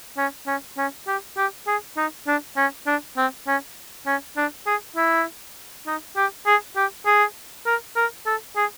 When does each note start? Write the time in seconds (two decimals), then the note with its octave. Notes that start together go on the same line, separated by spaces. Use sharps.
0.17 C#4
0.47 C#4
0.77 C#4
1.07 G4
1.37 G4
1.67 G#4
1.97 D#4
2.27 D4
2.57 C#4
2.87 D4
3.17 C4
3.47 C#4
4.07 C#4
4.37 D4
4.66 G#4
4.96 E4
5.87 D#4
6.16 G4
6.47 G#4
6.76 G4
7.06 G#4
7.66 A#4
7.96 A#4
8.26 A4
8.56 G#4